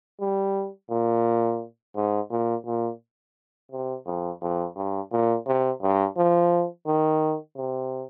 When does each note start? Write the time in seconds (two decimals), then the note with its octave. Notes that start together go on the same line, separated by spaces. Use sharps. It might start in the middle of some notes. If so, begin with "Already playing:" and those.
0.20 G3
0.90 A#2
1.96 G#2
2.31 A#2
2.66 A#2
3.72 C3
4.06 F2
4.42 F2
4.76 G2
5.12 A#2
5.46 C3
5.82 G2
6.17 F3
6.87 D#3
7.57 C3